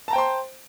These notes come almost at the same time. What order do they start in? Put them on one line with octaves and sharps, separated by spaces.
A5 A#5 G5 C5 C6